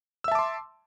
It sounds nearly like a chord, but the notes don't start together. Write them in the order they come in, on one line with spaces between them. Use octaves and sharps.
E6 E5 A5 D6 C6